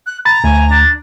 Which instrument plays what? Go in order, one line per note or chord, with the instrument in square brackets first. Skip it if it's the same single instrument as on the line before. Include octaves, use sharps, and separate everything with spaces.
[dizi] F#6
[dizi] A#5 [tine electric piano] B5 A6
[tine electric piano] D2 [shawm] G#5
[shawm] D4